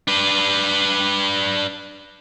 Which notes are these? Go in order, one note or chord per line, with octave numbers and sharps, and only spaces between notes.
D4 B4